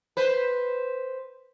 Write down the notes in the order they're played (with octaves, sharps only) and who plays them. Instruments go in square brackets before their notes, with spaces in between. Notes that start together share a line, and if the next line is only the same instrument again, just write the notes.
[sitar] B4 C5